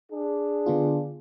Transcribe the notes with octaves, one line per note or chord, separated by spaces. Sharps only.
D4 G#4
D3 B3 F4